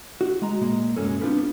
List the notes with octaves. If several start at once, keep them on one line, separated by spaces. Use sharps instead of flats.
F#4
G#3 A#5
A#2 G#3 A#3
C2 F#2 G#3 A#3 C#4 A4
B3 C4 D4 F4 A#4 B4